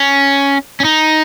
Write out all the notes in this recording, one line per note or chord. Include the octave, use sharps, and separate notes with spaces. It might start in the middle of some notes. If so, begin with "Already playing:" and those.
Already playing: C#4
C#4
D#4